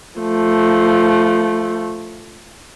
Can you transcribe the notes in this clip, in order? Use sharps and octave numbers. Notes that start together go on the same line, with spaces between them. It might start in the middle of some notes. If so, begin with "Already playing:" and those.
F3 A3